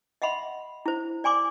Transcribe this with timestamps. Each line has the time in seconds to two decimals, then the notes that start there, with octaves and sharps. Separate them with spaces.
0.22 D#5 E5 F#5 B5 C6
0.86 E4 C5
1.24 D5 G#5 C6 D6